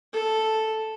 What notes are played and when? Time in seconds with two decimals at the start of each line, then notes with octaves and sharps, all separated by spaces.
0.13 A4